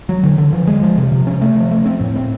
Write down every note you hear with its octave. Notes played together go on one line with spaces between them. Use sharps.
F#3
D3
D3
F3
G#3
F3
C3
C3
C#4
A3
F3
A3
C4
A2
C4